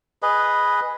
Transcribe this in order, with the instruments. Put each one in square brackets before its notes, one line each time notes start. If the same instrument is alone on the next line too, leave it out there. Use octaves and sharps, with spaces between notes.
[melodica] G#4 B4 D#5